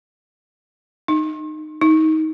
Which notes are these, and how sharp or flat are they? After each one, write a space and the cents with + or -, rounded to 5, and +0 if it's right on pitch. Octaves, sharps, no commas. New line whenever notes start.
D#4 -20
D#4 +20